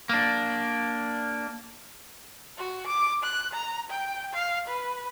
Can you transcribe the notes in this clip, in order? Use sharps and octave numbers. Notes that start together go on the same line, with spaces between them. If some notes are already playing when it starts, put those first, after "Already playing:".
A#3 D4
F#4
D6
F#6
A#5
G5
F5
B4